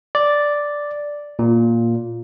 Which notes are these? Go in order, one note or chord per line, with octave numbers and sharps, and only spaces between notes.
D5
A#2